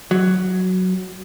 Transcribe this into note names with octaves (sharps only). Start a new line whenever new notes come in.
F#3